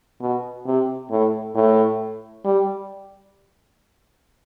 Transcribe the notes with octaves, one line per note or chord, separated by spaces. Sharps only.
B2
C3
A2
A2
G3